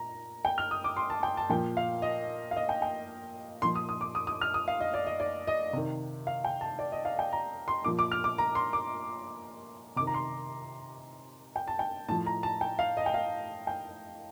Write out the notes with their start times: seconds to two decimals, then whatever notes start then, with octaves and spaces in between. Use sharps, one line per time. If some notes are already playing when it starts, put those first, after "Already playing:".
Already playing: A#2 A#5
0.45 G5
0.58 F6
0.71 D#6
0.84 D6
0.97 C6
1.10 A5
1.23 G5
1.37 A5
1.49 A#2 F3 G5
1.77 F5
2.02 D#5
2.51 F5
2.56 D#5
2.69 G5
2.82 G5
3.62 A#2 F3 C6
3.75 D#6
3.89 D#6
4.01 D6
4.15 D#6
4.27 D#6
4.41 F6
4.54 D#6
4.68 F5
4.81 D#5
4.94 D5
5.07 D#5
5.20 D5
5.47 D#5
5.73 C3 D#3
6.27 F5
6.44 G5
6.61 A5
6.79 D5
6.92 D#5
7.05 F5
7.19 G5
7.33 A#5
7.68 C6
7.84 A#2 F3 D6
7.99 D6
8.12 F6
8.24 D6
8.38 A#5
8.55 C6
8.73 D6
9.96 C3 D6
10.00 D#3
10.07 A#5
10.14 C6
11.56 G5
11.68 A5
11.79 G5
12.08 A2 A5
12.11 F3
12.26 A#5
12.43 A5
12.61 G5
12.79 F5
12.97 D#5
13.06 G5
13.14 F5
13.67 G5